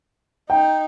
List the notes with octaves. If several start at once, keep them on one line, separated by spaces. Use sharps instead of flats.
D#4 G5